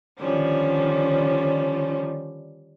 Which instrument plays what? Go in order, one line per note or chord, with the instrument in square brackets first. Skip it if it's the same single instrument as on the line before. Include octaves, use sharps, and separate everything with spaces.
[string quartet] D3 D#3 F3 G3 C#4